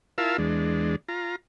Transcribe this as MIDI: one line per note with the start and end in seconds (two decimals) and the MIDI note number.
0.18 0.37 64
0.18 0.37 65
0.18 0.37 70
0.18 0.37 77
0.18 0.37 81
0.18 0.37 88
0.38 0.96 40
0.38 0.96 56
0.38 0.96 62
1.08 1.36 65
1.08 1.36 82